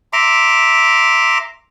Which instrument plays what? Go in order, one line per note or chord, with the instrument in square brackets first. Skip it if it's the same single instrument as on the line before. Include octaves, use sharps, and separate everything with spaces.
[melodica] E5 A#5 C6 D6